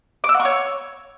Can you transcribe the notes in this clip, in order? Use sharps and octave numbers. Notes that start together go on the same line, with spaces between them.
D6
E6
F#5
C#6
C#5